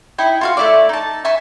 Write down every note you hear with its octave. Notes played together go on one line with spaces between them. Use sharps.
D#4 E4 G5
F4 F#4 F5
A3 E4 D5
D#4 A5
E5 G#5 C#6 G6